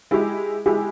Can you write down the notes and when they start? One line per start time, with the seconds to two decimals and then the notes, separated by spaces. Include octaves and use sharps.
0.11 G#3 E4 G4
0.66 G#3 E4 G4